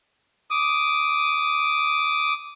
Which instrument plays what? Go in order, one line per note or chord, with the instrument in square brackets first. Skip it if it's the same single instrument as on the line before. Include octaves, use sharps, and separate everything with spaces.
[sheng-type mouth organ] D6 D#6